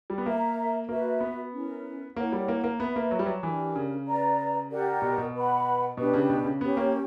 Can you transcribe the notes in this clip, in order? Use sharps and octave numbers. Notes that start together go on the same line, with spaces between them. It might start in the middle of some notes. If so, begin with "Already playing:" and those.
G3
B3
A#3 A#4 E5 A#5
A#3 F#4 B4 E5
B3
C#4 E4 A#4
A#3 E4 A#4 C#5 F#5
G3
A#3
A#3
B3 B4 E5 B5
A#3
F#3
G3
F#3
E3 D4 G4 A#4
C#3
B4 D5 A#5
G4 A#4 D5 F#5
B2
B2
B4 F#5 B5
B2 D4 G4 B4
C#3
B2
C#3
B3 C#4 G4 C#5
A#3